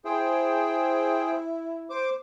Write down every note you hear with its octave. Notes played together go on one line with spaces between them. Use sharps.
E4 G#4 C5 G5
C5 D6